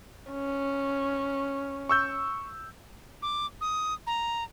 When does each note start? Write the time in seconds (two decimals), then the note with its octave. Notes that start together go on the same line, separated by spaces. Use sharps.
0.31 C#4
1.89 C#6 E6 G6
3.22 D6
3.61 D#6
4.07 A#5